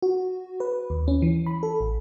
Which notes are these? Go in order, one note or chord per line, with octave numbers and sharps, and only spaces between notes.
F#4
B4
D#2
C#4
E3
B5
A4
A1